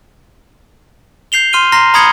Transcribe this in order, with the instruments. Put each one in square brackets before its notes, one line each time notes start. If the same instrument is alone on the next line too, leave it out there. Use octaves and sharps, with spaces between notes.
[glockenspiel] G6 C7 F7 G7
C6 F6 D#7 G7
A#5 C6 F6 A#6 C7
A#5 B5 D#6 G#6 C#7 G7